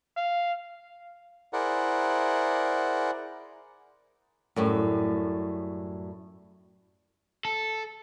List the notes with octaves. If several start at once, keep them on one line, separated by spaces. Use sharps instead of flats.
F5
E4 G#4 A#4 C5 D5 F#5
F#2 A2 G3
A4